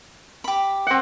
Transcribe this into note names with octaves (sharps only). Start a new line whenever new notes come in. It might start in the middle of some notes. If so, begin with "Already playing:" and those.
G4 B5
C4 F#5